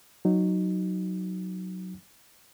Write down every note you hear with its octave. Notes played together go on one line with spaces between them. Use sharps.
F#3 D#4